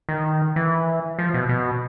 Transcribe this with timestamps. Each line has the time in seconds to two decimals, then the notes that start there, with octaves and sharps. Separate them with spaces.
0.09 D#3
0.56 E3
1.19 F3
1.34 B2
1.49 B2